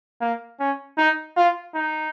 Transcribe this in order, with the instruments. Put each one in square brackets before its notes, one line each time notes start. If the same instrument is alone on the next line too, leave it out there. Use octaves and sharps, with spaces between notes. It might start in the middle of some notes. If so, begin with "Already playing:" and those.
[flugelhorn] A#3
C#4
D#4
F4
D#4